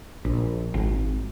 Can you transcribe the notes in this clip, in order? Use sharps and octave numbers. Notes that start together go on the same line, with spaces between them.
A#1
G#1